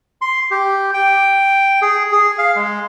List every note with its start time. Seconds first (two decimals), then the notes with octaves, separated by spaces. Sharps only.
0.21 C6
0.51 G4
0.94 G5
1.82 G#4
2.12 G#4
2.38 F5
2.56 G#3